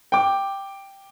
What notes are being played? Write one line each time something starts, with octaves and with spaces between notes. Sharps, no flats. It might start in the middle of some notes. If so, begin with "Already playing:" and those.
G5 D6